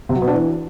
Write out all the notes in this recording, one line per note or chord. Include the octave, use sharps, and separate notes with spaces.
C3
F#3
B2
D4
E3